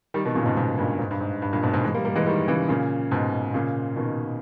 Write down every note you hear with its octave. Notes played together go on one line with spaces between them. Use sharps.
D#3 G3
B2 D#3
A#2 C#3
G#2 B2
G#2 B2
G2 A#2
G#2
G2
G#2
G2
G2 A#2
G#2 B2
G#2 B2
E3 G#3
G3 A#3
G3 A#3
E3 G#3
D#3 G3
C#3 E3
A#2 C#3
G#2 B2
A#2 C#3
B2 D#3